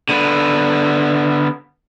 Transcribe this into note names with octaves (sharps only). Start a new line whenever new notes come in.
D3 B3